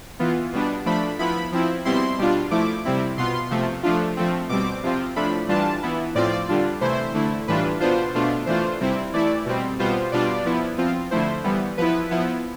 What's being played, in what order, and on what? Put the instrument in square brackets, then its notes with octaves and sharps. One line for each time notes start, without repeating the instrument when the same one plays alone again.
[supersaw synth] E3 B3 F4
B2 G3 B3 D4
F3 A3 D4 B5
F3 B3 E4 B5
F3 C4 E4
B2 G3 C4 E4 C6
B2 G3 D4 F4
F3 A3 E4 D6
C3 G3 C4 E4
B2 B3 F4 C6
C3 F3 A3
F3 A3 D4 F4
F3 A3 C4
B2 G3 C4 D6
C3 F3 C4 F4
A2 F3 A3 D4 B5
E3 G3 D4 F4 A5
E3 B3 E4
A2 F3 C4 F4 D5
D3 G3 D4 F4
C3 E3 A3 E4 C5
D3 A3 E4
A2 E3 G3 D4 F4 B4
B2 B3 D4 F4 C5
B2 A3 D4 F4
E3 A3 D4 F4 C5
C3 G3 C4 E4
E3 A3 E4 D5
B2 G3 C4
B2 G3 B3 F4 C5
B2 G3 D4 F4 D5
F3 B3 E4
F3 C4 F4
D3 F3 A3 E4 C5
E3 G3 B3
F3 B3 E4 B4
F3 B3 E4